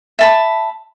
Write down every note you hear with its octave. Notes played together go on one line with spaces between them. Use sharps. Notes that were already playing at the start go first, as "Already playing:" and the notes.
E5 A5 B5